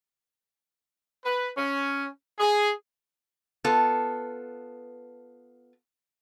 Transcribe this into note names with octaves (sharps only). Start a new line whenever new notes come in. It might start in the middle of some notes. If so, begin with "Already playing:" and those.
B4
C#4
G#4
B3 F4 A4